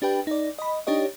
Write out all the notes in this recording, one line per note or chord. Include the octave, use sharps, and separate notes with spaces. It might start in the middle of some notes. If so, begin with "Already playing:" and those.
D4 G4 B4 G5
D#4 D5
D#5 B5
D4 D#4 G4 C#5 D#5